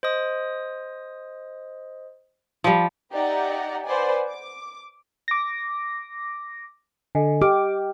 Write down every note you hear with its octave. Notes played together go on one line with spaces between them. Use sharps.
C5 D#5 D#6
F3 G3
D#4 G4 D5 E5 F#5 A#5
B4 C5 D5 F#5 G#5
D6
D6 A#6
D3 A4 D#5 G#5
G4 D#5 D6 F6